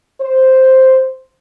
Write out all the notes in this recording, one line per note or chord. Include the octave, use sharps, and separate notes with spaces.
C5